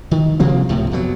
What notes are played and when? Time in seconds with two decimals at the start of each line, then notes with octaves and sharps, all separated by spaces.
0.11 D#3
0.40 C3 F3 A#3 C4
0.69 C#2 A2 C3
0.91 F2 B2 F#3